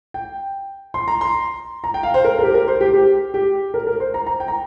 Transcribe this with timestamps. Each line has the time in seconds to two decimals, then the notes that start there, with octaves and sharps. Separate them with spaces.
0.14 G5
0.94 C6
1.08 A#5
1.21 C6
1.84 A#5
1.94 G5
2.03 F5
2.14 C5
2.24 A#4
2.39 A#4
2.43 G4
2.54 A#4
2.68 C5
2.81 G4
2.94 G4
3.34 G4
3.74 A#4
3.87 A#4
4.00 C5
4.14 A#5
4.26 A#5
4.40 G5
4.48 A#5